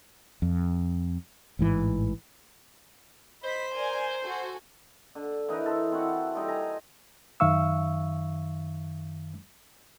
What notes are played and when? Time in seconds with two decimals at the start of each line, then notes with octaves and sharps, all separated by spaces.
0.42 F2
1.59 A1 G#2 E3
3.43 C5 D#5 B5 B6
3.74 A#4 D5 G#5
4.22 F#4 A4 G#5
5.15 D3
5.48 E3 D#4 A#4 B4
5.66 A4 C5
5.92 C4 E4 F#4 F#5
6.35 G3 D#4 A4
6.48 G#5 A#5
7.40 F#2 D#3 E5 F5 C#6 E6